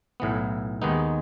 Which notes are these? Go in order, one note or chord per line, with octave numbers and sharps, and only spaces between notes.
B1 A2 E3 B3
D#2 D#3 G#3 B3 D#4